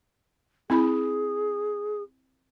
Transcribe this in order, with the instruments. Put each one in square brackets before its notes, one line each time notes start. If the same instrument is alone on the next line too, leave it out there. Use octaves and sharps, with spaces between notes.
[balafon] C4 E4 B5 [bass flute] G#4